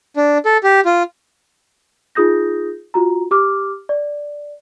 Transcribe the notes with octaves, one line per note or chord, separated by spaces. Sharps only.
D4
A4
G4
F4
D#4 F4 G#4 D#6 G6 A#6
F4 F#4 A#5
G4 D6 F6
D5